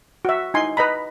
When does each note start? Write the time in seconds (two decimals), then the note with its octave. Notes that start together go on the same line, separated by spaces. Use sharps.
0.25 F#4 E5
0.54 D#4 E4 G#5 C6
0.77 B4 D#5 A#5 B5